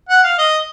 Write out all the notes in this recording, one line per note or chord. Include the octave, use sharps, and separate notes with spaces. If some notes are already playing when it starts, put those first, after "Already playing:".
F#5
F5
D#5